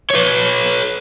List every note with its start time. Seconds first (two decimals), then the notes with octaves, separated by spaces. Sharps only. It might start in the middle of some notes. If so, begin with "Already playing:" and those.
0.10 B4 C#5